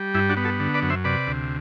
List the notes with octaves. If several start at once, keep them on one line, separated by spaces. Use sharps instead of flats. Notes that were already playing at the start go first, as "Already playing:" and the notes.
Already playing: G3
G2 E4
D4 F#4
B3
F#4 A4
D3
B4 D5
F#2
C5 E5
C3 B4 D5
D2